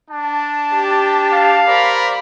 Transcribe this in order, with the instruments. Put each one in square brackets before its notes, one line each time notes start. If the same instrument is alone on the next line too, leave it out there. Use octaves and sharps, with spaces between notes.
[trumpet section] D4 A5
[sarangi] G4
[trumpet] F5
[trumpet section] A#4 C5 D5 [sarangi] B5